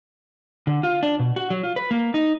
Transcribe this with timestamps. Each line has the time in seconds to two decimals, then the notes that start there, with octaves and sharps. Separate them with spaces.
0.67 D3
0.83 F4
1.03 D4
1.19 B2
1.36 F#4
1.50 F#3
1.63 F4
1.76 B4
1.91 A#3
2.14 D#4